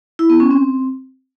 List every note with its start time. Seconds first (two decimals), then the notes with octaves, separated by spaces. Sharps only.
0.19 E4
0.30 B3
0.40 C#4
0.51 C4